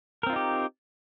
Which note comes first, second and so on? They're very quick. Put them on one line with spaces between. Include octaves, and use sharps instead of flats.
A#4 C4 F4 D#4 G4